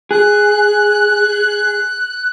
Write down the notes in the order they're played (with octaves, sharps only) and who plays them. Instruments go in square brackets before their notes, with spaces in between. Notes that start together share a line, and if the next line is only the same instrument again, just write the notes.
[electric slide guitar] G#4 [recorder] F#6